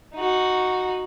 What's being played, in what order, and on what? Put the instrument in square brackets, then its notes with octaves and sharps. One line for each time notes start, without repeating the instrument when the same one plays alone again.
[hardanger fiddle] D#4 F#4